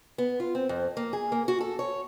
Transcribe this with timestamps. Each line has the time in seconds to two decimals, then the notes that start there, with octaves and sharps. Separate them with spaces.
0.18 B3
0.40 F4
0.55 C4
0.69 F2
0.97 A#3
1.13 G#4
1.32 A#3
1.48 F#4
1.61 A4
1.79 C#5